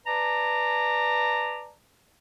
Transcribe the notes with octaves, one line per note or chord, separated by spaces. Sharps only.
B4 D5 A5 A#5